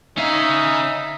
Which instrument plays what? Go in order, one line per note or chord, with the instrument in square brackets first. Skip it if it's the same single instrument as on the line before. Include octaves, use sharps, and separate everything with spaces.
[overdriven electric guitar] C#4 F5 [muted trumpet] D#4 [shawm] E5